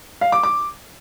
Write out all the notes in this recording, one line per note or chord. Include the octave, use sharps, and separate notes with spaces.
F5
D6
D6